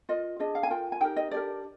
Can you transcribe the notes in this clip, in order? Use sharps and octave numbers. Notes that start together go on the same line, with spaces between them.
F4 A#4 D#5
D4 G#4 D#5
F5
G#5
F4 A#4 G5
G#5
D#4 G4 A#4 G5
D#5
D4 G4 A#4 D5